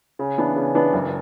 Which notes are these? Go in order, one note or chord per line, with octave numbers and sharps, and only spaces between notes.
C#3
E3 B3 D4
C#3
E3 B3 D4
F#1